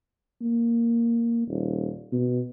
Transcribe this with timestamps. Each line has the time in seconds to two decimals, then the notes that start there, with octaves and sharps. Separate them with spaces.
0.41 A#3
1.48 D#1
2.12 B2